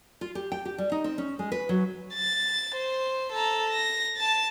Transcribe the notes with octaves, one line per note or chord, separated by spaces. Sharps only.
F4
G4
G5
G4
G3
D#4
C4
C#4
G#3
B4
F#3
A6
C5
A4 A#5
A#6
A5 A6